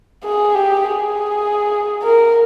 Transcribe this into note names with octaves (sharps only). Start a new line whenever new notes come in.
G#4
G4
G#4
A#4